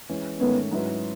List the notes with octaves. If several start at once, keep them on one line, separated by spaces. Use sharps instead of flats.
E3 G#3 C#4
G#2 D#3 A3 B3 C#4
G#2 F#3 C#4 E4 B4